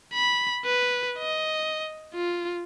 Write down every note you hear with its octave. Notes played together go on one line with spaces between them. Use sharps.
B5
B4
D#5
F4